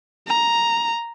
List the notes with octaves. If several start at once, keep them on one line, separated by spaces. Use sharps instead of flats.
A#5